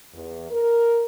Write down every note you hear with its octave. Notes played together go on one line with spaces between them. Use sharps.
E2
A#4